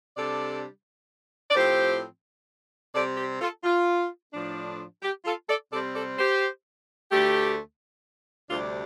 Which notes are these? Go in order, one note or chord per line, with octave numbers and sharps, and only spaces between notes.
C3 G3 D4 A4 D5
D5
A2 F3 C4 G4 C5
C3 G3 C4 A4 D5
G4 C5
F4 A4
F4
A2 F3 D4
G4
F4 A4
A4 D5
C3 G3 C4 A4 D5
A4 D5
G4 C5
D2 D3 A3 G4
D2 C3 G3 D4 F4 A4